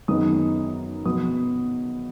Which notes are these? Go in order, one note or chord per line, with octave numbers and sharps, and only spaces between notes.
F#2 D#3 G#3 B3 D#4 D#6
B2 F#3 B3 D#6